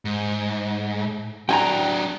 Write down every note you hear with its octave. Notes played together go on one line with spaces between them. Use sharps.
G#2
F#3 D4 G5 G#5 A#5